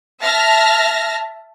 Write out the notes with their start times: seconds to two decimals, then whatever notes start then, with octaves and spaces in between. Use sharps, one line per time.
0.22 E5 A5 F6 A#6